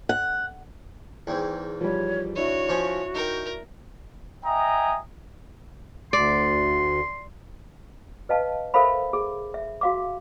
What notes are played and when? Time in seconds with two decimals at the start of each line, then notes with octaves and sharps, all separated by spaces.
0.09 F#5
1.27 E2 G#2 G5
1.81 F3 G3 C#5
2.36 D4 E4 F#4 C#5 E5
2.69 F3 C#4
3.15 D#4 A#4 G5
4.45 D#5 E5 G5 G#5 A#5 D#6
6.13 D2 D5 C6
8.29 B4 D#5 F5 A5
8.74 A4 A#4 C5 E5 F5 B5
9.13 G#4
9.54 E5
9.81 F#4 F5 D6